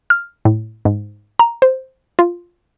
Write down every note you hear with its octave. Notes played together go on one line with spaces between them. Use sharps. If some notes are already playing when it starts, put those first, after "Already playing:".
F6
A2
G#2
A#5
C5
F4